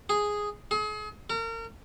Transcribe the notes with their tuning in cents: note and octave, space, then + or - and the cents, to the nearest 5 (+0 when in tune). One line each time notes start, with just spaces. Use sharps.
G#4 +0
G#4 +40
A#4 -35